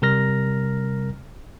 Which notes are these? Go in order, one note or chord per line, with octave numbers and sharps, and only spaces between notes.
C3 G3 A#4 F6 A#6